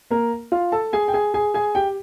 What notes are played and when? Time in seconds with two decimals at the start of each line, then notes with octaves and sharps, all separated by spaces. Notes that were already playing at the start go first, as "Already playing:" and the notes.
0.10 A#3 A#4
0.52 F4 F5
0.72 A4 A5
0.93 G#4 G#5
1.08 G5
1.14 G#4 G#5
1.34 G#4 G#5
1.54 G#4 G#5
1.75 G4 G5